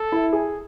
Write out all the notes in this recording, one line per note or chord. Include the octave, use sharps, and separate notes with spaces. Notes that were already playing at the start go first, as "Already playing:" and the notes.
Already playing: A4
E4
G#4